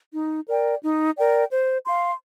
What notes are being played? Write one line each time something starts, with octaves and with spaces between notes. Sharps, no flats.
D#4
A#4 D5 G5
D#4
A#4 D5 G5
C5
F5 C6